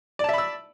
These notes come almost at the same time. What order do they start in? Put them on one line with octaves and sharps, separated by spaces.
D5 A5 E5 B5 E6